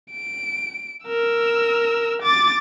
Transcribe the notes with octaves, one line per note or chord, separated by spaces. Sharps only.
D7
A#4 E6
D6 A6